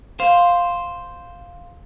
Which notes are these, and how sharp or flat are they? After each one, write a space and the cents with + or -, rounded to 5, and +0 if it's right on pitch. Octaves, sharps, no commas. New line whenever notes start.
C5 +0 F5 +5